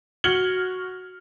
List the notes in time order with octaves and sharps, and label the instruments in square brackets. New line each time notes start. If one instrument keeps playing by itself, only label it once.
[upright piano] F#4 F6 G#6 C#7 F#7 G7